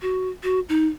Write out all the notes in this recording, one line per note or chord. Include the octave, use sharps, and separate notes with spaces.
F#4
F#4
D#4